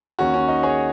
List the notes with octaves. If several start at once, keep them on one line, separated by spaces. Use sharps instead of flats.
D#2 D#3 C#4 F#4
C#4
D#4
G#4 C#5